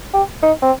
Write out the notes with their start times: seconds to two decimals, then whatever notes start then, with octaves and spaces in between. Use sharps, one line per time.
0.14 G4
0.43 D#4
0.62 C4